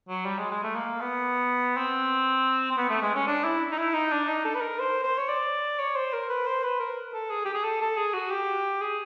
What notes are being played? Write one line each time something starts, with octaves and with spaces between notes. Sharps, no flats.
F#3
G3
G#3
G#3
A3
A#3
B3
C4
C4
B3
A3
G#3
C#4
D4
E4
D#4
E4
D#4
D4
D#4
A4
B4
A#4
C5
C5
C#5
D5
C#5
C5
A#4
B4
C5
B4
A#4
A4
G#4
G4
G#4
A4
A4
G#4
F#4
G4
G#4